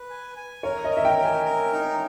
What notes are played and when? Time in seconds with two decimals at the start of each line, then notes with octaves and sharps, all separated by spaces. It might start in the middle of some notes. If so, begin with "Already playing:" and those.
Already playing: B4
0.10 G#5
0.37 G#5
0.63 A#4 C#5
0.85 D#5
0.91 A#4
0.97 E5
1.05 G5
1.18 A#4
1.25 G#5
1.45 A#4
1.73 D#4